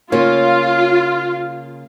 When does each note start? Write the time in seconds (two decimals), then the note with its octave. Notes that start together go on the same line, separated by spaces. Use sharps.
0.12 C#3 A#3 F4 C#5